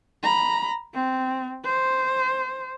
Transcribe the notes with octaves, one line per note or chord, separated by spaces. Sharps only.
A#5 B5
C4
C5